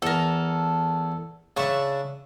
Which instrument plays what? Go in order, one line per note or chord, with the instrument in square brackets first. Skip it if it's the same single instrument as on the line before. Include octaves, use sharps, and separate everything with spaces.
[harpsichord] E2 [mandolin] A4 A#4
[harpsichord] C#3 E5 [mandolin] D4 C#6